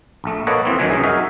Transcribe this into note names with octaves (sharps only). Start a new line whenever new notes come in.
A#1 A3
A#3 A4 B4 C#5 D#5 F#5
F2 E3 C4
D2 D#3 E3 F#3 G#5
C2 F#2 G#4
D#4 F#4 G#4 A#4 E5